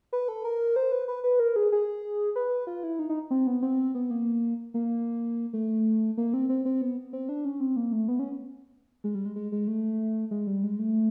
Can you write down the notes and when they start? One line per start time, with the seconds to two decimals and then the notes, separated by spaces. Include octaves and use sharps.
0.13 B4
0.28 A4
0.45 A#4
0.76 C5
0.92 B4
1.08 B4
1.24 B4
1.40 A#4
1.56 G#4
1.72 G#4
2.36 B4
2.67 F4
2.83 E4
2.99 D#4
3.09 D#4
3.31 C4
3.47 B3
3.62 C4
3.95 B3
4.11 A#3
4.74 A#3
5.53 A3
6.17 A#3
6.34 C4
6.49 C4
6.65 C4
6.82 B3
7.13 C4
7.29 D4
7.45 C#4
7.60 C4
7.77 A#3
7.92 A3
8.08 B3
8.19 C#4
9.04 G#3
9.15 G3
9.25 G#3
9.36 G#3
9.52 G#3
9.68 A3
10.31 G#3
10.47 G3
10.64 G#3
10.79 A3